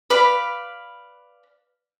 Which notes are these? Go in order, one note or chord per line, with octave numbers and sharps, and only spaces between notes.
B4 D5 F5 B5